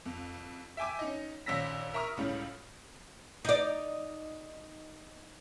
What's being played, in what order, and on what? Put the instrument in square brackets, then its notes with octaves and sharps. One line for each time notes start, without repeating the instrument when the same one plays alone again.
[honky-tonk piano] F2
E5 G5 G#5 D6
C#4 D#4 D#5
A#1 D#2 C#4 E6 A#6 B6
A#4 E5 A#5 C#6 D#6 F6
C#2 A2 C#3 G3 C#4
[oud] D#4 D5